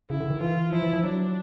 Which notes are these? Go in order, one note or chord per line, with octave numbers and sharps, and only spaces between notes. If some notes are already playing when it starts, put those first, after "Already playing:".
C#3 E4
D3
D#3
E3 F4
F3 E4
E3
F3
F#3 D4